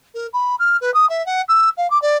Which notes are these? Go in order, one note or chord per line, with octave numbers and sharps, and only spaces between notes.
A#4
B5
F6
B4
D#6
E5
F#5
E6
F5
D6
D5